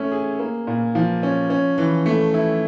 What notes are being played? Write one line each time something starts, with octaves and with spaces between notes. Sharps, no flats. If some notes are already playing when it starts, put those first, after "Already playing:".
Already playing: A3 C#4 E4
G#4
A#3
A#2
F3
C#4
C#4
E3
A3
E4